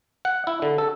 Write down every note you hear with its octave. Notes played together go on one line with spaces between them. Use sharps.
F#5
E4
D3
A4